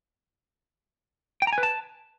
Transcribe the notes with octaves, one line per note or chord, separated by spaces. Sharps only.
G5
A#5
G#5
B4
A5